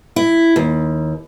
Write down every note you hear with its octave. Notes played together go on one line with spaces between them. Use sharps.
E4
D#2